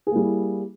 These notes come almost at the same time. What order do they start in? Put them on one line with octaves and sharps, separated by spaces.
G#4 A#3 G3 E4